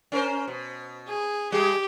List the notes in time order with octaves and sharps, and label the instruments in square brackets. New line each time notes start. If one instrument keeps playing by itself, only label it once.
[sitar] C#4 A#4 C5
B2
[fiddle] G#4
[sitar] G3 G#4 [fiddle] G4